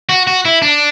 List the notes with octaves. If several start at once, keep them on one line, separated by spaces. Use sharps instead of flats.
F#4
F#4
E4
D4